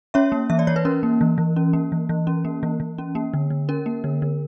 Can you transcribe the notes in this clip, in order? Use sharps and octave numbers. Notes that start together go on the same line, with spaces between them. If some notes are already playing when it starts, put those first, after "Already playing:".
C#4 C#5 E5
A#3
E3 E5
D5
E3 C#5
B4
C#4 A#4
A#3
E3
E3
C#4
A#3
E3
E3
C#4
A#3
E3
E3
C#4
A#3
D3
D3
C#4 A#4
A#3
D3
D3